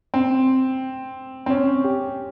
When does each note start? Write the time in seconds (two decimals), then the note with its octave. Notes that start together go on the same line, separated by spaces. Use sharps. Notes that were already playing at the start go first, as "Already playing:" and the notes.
0.14 C4
1.46 C4
1.50 C#4
1.84 G4